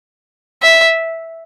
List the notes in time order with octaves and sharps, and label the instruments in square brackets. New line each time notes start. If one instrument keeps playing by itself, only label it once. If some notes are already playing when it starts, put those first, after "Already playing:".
[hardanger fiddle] E5